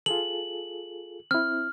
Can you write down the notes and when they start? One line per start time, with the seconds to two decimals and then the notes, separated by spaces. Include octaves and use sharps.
0.06 F4 G#4 A4 F#7
1.31 C4 E4 F6